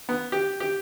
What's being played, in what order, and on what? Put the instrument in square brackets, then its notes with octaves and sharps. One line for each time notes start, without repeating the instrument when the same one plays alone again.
[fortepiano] B3
G4
G4